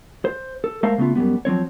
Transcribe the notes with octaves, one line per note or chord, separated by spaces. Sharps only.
C5
A4
G#3 A3 A4 A#4 C5 F5
C#3 A3 B3 F4
F#2 C#3 G3 B3
F3 F#3 C4 C#5